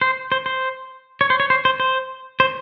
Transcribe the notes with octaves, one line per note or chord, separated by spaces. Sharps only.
C5
C5
C5
C#5
C5
C#5
C5
C5
C5
C5